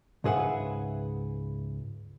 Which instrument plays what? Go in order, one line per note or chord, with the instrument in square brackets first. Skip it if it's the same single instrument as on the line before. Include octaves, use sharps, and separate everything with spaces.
[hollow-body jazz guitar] C#2 G#2 G#4 B4 E5 F#5